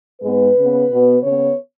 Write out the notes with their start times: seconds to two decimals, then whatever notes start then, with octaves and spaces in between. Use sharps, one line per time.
0.22 G#2 G#3 B3 B4
0.56 C#3 B3
0.89 B2 B3
1.23 C#3 B3 C#5